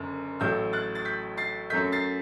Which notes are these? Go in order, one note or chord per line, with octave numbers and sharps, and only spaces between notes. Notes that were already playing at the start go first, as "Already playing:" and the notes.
Already playing: F#1 F#2 D3
A1 A2 F#3 A3 E6 G6
F#6 A6
A6
G6 B6
A6 C7
F#2 F#3 A3 G6 B6
A6 C7